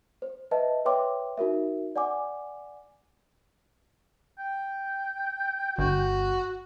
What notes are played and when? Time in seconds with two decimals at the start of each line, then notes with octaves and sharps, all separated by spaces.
0.22 C5
0.51 B4 D#5 E5 A5
0.85 B4 C#5 E5 G5 C6 D6
1.38 D#4 F#4 A#4 E5
1.96 D5 F#5 G#5 D6
4.39 G5
5.78 G1 F#4